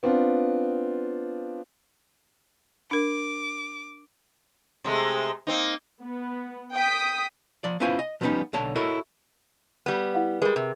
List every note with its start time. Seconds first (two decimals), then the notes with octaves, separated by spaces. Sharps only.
0.03 B3 C4 D4 F4
2.91 D4 A#4 D6
4.84 C3 G#3 A3
5.47 A#3 C4 D#4
6.00 B3
6.74 G5 D#6 B6
7.64 F3 D5
7.80 B3 C#4 E4 F4 C5 G#5
7.99 D#5
8.21 F3 G3 A#3 B3 C#4 D#4
8.53 B1 D3 C#5 A5
8.76 E4 F#4 A4 A#4 C#5 D#5
9.86 G3 B3
10.14 E4 F5 F#5
10.42 G3 G#3 G#4 A#4 B4
10.56 C3